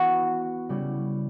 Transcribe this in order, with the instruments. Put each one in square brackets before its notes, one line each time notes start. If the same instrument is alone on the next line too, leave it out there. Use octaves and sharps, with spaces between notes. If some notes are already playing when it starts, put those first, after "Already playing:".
Already playing: [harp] E3 B3 E4 [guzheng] F#4
[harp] C#3 G3 C#4 E4